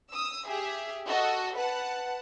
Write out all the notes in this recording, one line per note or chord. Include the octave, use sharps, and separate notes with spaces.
D#6 E6
G4 G#4 E5
F#4 A4 D#5
B4 F#5 A5